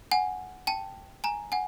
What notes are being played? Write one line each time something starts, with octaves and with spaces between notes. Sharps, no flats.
F#5 G#5
G5 A5
G#5 A#5
F#5 G#5